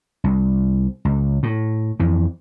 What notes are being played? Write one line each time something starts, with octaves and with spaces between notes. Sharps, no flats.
C2
C#2
A2
F2 E3